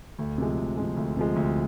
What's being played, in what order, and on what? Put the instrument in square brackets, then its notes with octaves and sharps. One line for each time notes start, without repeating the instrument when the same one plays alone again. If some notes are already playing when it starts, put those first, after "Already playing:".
[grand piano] D2
C3 F3 G#3
D2
C3 F3 G#3
D2
C3 F3 G#3
D2